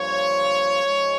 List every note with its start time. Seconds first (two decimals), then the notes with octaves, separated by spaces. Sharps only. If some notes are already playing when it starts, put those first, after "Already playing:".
Already playing: G2 F3 A#3 C#5
0.85 G#2 F3 G#3